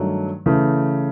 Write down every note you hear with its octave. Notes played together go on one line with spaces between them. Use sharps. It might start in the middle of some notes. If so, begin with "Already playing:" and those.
Already playing: G2 D#3 F#3 A3
C#3 E3 A3